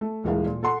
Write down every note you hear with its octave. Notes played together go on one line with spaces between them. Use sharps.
A3
D#1 E3 G#3 A#4 F5
A#2
A4 F#5 C6